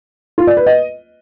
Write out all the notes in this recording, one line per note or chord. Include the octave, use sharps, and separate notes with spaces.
F4
D5
B4
D#5